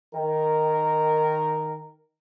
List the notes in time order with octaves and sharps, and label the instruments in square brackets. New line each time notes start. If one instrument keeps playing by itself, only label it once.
[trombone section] D#3 A#4